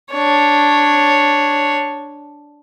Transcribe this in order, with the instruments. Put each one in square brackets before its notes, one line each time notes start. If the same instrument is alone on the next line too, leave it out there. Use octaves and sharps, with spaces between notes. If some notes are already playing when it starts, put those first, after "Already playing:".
[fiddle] D4 C#5